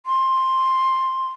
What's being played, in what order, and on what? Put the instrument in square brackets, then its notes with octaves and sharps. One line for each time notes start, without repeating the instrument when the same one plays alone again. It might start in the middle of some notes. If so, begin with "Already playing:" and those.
[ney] C6